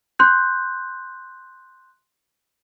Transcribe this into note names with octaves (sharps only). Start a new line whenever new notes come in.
C6 F#6 G6